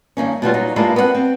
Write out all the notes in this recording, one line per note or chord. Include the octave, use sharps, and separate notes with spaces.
G2 D#3 A#3 C#4
B2 F#3 G3 F4
A#2 F#3 D#4 F4
G2 G#3 A#3 D4 E4 F4
B3 C4 C#5 F#5
C4